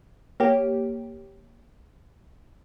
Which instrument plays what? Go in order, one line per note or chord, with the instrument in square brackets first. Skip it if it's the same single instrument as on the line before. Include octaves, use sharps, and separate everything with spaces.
[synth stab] A#3 G4 [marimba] C#5